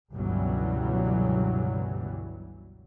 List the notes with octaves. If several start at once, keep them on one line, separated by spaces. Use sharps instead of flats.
G1 C#2 B2 E3 F#3 G3